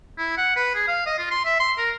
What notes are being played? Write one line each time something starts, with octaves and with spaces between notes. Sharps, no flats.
E4
F#5
B4
G#4
F5
D#5
F4
C6
E5
C6
A#4